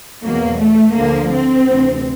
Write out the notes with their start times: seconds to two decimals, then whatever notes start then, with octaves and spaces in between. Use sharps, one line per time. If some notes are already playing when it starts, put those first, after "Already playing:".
0.24 E2 B2 F#3 A#3
0.60 A3
0.96 D2 D3 F3 A#3
1.33 C4
1.69 D2 C3 E3